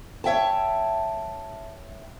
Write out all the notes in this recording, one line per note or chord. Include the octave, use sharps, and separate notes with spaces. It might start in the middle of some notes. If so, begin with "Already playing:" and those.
C#5 E5 G5 A5